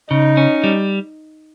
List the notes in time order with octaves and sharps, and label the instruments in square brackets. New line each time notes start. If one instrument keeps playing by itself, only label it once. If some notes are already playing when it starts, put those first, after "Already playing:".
[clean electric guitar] C#3 [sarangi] D#4
[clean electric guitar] C#4
G3